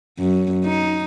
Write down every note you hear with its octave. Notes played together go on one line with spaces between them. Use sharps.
F#2
D#4